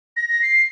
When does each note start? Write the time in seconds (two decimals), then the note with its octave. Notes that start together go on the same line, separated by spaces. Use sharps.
0.16 A#6
0.29 A#6
0.42 C7